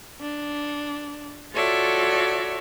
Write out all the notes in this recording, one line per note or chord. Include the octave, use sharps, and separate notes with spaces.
D4
F4 F#4 A4 C#5 D5 E5